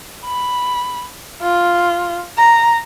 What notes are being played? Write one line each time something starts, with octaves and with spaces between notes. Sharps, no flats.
B5
F4
A#5